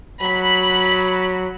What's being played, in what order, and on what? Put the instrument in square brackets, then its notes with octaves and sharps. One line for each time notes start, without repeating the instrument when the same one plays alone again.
[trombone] F#3 [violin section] B5